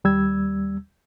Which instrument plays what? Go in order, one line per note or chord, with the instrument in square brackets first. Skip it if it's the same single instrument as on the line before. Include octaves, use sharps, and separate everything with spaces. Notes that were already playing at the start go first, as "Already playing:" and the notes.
[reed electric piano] D#2 G3 E6 G#6